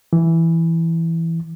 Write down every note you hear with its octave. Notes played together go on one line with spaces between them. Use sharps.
E3